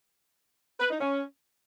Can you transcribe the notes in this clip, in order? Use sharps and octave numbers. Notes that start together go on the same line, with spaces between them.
B4
D#4
C#4